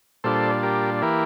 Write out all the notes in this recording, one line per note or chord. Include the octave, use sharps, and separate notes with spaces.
A#2 G3 D4 F4 A4 C5
G4 A#4
E3 A#3 E4 G4 A#4